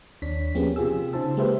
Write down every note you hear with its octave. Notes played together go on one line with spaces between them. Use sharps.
D#2 D4 C#5 B6
F3 A#3 B3 C#4 G4 G#4
C3 F4 G4 G#4 E6
C#3 D#4 F4 C5 A5 E6
G#3 A#3 G4 B4 C5 E5